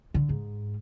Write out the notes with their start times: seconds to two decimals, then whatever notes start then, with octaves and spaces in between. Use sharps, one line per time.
0.14 D3
0.29 G#2